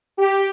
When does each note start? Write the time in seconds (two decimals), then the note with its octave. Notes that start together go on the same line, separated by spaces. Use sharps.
0.19 G4